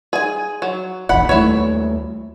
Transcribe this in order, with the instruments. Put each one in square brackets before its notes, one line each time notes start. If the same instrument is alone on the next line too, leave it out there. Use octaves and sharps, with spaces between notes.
[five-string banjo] G#4 G#5
F#3
[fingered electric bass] D#1 A#1 E2 [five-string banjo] F#5 B5
[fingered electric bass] D#2 G3 A3 [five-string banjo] E4 C#5